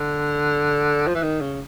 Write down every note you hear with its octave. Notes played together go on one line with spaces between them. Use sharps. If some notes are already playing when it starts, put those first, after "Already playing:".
Already playing: D3
F3
E3
D#3
C#3